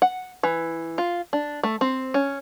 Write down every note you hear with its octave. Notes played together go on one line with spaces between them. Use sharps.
F#5
E3
F4
D4
A3
C4
C#4